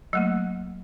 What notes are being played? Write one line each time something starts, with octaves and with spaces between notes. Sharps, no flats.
F#3 A3 A#3